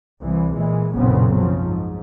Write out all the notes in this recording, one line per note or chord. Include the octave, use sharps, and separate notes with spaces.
C2 E3
A#2 E3 G#3
F#1 B1 A#2 C#3 B3 C4
C#3 F3 F#3
G#2